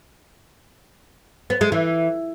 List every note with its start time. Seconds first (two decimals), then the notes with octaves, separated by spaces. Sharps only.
1.50 B3
1.61 G#3
1.72 E3